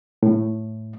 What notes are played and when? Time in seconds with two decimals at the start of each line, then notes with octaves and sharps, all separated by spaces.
0.23 A2